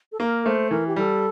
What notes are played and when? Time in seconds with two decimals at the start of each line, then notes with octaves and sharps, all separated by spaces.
0.12 A4
0.20 A#3 A#4
0.45 A3 C5
0.71 E3 A#4
0.87 G4
0.96 G3 A4